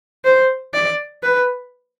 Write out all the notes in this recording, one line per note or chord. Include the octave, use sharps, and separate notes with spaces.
C5
D5
B4